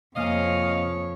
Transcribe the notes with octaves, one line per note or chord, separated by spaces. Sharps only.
F2 C3 A#3 C#5 D#5 F5 G#5